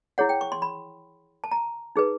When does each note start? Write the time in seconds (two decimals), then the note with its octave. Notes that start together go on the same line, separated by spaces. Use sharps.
0.18 E4 G#4 C#5 F#5
0.29 G5
0.41 C#6
0.52 C6
0.62 B5
1.44 A5
1.51 A#5
1.96 D#4 G#4 B4